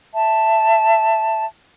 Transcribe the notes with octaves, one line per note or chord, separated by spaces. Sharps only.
E5 A5